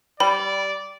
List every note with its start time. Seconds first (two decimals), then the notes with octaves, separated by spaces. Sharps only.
0.20 G3 D5 B5